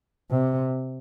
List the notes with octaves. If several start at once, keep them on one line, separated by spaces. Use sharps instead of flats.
C3